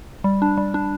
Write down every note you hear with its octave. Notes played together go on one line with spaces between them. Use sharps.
G3
D4
G3
D4